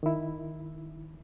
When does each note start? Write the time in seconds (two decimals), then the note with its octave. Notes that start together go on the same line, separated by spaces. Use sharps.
0.03 D#3 E4